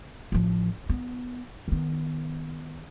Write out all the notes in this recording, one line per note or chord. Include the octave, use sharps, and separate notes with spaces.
A1 F3
B3
D#3 B3